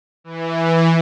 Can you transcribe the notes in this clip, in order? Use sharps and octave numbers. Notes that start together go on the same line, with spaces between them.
E3